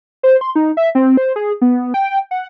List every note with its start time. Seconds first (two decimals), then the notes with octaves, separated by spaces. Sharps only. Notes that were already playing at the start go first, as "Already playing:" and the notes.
0.23 C5
0.41 C6
0.55 D#4
0.77 E5
0.95 C4
1.17 C5
1.36 G#4
1.62 B3
1.94 G5
2.31 F#5